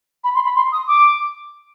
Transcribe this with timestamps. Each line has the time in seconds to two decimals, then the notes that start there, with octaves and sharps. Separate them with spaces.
0.24 B5
0.35 C6
0.45 B5
0.55 C6
0.72 D#6
0.88 D6